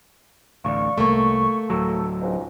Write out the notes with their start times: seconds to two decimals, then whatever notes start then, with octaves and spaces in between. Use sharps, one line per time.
0.65 A1 D2 D5 F5 C#6
0.98 C2 A3 A#3 C#6
1.70 D1 F#3 A4
2.21 C#2 G#2